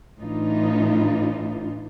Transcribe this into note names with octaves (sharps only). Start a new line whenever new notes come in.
A2 E3 D4 D#4 F4